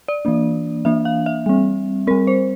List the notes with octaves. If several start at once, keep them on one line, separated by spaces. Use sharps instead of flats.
D5
E3 A#3 D4
E3 A#3 D4 E5
F5
E5
G3 C4
G3 C4 A#4
C5